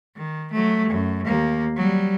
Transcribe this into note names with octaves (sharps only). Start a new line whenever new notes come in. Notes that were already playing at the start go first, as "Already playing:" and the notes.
D#3
F#3 A3
F#2
D#2 A#3
F#3 G3